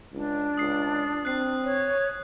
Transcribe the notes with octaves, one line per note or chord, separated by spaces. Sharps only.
C#2 D4
C#2 D#6 C7
C4 F#6 C7
C#5